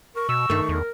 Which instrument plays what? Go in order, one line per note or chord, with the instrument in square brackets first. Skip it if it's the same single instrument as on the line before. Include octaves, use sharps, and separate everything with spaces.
[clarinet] A#4 [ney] C#6
[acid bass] B2 [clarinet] E6
[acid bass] G2 [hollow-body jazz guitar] D#3 A3
[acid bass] E2 [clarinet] A#4